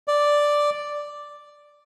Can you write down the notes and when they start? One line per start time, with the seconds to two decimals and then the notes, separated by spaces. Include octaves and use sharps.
0.08 D5